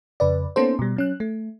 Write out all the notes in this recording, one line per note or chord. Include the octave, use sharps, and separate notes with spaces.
F2 C#3 B4 D5
A#3 B3 C#4 D#4 A4 C5
B2 G3
F#3 C#4 F#6
A3